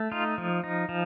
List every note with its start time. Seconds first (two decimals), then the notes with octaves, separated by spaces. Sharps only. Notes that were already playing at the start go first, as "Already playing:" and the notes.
Already playing: A3
0.12 D#4 F4
0.38 F3
0.64 D#4
0.89 F3